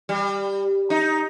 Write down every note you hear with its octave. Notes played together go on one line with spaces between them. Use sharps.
G3
D#4